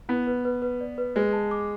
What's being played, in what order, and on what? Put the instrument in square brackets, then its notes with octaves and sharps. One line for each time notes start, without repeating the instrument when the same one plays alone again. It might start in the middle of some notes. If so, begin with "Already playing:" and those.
[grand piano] B3 [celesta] E4
[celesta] B4
B4
B4
D5
B4
[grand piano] G#3 [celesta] B4
[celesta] A5
D6